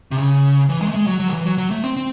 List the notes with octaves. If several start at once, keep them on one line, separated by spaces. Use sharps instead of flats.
C3
C#3
E3
G#3
A3
G#3
F#3
F#3
D#3
E3
F#3
F#3
A3
C4
C4